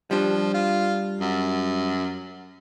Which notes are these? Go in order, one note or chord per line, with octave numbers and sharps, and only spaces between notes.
F3 G3 D4
F4
F#2